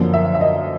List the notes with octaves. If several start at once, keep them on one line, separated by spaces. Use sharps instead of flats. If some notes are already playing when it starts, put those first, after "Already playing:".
Already playing: F#2 D3 F3 A#3
E5
E5
D#5